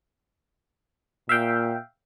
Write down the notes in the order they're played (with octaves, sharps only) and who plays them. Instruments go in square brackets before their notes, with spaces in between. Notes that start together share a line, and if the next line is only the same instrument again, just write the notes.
[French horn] A#2 [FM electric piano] E5 F5 G5